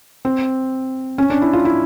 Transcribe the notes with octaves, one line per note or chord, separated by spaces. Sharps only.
C4
C#4
D4
E4
F4
E4